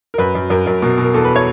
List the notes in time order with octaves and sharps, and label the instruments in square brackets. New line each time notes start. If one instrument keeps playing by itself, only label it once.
[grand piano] A#4
F#2 B4
F#2
F#2 A#4
F#2 A#4
B2 A#4
B2
A#4
E2 A4
B4
C#5